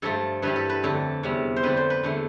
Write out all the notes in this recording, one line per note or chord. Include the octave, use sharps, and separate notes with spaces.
G2 F3 A3 A4
G2 E3 G3 B4
A4
B4
F2 D3 A3 A4
E2 C3 G3
C5
F2 D3 A3 B4
C5
B4
E2 D3 A3